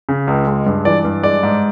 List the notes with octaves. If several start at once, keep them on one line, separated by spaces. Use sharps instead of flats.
C#3
C#2
G#3
G2
E3 D5
G2
G#3 D5
G#2